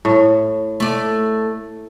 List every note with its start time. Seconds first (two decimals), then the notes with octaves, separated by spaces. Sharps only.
0.05 A2
0.80 A3 D5